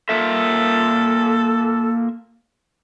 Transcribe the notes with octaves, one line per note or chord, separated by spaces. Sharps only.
A#3 F4 A4 E5